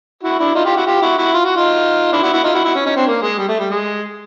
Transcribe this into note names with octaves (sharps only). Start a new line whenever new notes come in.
E4 F#4
D4 E4
D#4 F4
F4 G4
E4 F#4
F4 G4
E4 F#4
E4 F#4
F4
F#4
D#4 F4
D4 E4
E4 F#4
E4 F#4
D#4 F4
E4 F#4
E4 F#4
C#4
C#4 D#4
C4 D4
A#3
G#3
G3
A3
G3
G#3